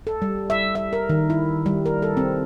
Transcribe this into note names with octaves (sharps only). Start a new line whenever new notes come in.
A4
G3
E5
E5
A#4
D#3
E4
G3
A#4
A4
C4